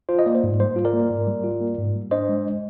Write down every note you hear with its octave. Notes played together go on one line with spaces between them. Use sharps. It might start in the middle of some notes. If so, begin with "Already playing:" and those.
F4 C5
D#5
A#3 D5
C5
G#2
G3 C5
F4
A#4 D5
A#3
G#2
G3
F4
A#3
G#2
G3
D4 C5 D#5
G#3